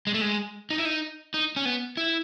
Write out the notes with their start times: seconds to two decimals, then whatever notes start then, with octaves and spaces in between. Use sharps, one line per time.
0.07 G#3
0.14 A3
0.21 G#3
0.70 D#4
0.78 E4
0.85 D#4
1.34 D#4
1.56 C#4
1.65 B3
1.97 E4